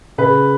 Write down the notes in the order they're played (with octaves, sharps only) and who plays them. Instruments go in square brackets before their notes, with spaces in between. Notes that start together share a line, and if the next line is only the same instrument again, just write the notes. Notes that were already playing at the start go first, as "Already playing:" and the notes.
[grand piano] C#3 B4